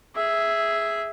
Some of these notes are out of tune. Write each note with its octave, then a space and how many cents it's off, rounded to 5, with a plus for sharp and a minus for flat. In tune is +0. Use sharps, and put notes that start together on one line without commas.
G#4 +0 E5 +0